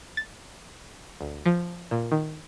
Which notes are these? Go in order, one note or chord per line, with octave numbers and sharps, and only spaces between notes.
A6
D2
F3
A#2
D#3